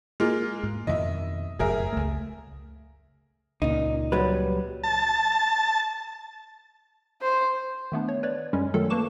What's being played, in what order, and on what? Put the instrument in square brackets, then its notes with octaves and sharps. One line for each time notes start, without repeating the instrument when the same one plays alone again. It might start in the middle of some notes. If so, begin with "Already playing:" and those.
[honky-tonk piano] G#3 A#3 F4
[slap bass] G#2
[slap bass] F2 B2 D#3 [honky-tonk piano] D#5 E5
[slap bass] F#1 F2 A2 [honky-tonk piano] G#4 A#4 E5
[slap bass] C#2 A3
[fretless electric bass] C#2 A#2 [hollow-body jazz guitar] D#4
[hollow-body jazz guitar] F#3 G3 B4
[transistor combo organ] A5
[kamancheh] C5
[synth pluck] D#3 A3 B3 D4
C#5
B4 C#5 D5
F#2 G3 G#3 C#4
D#3 F#3 A3 F4 A4
A#3 B4 A5 C#6 D6 E7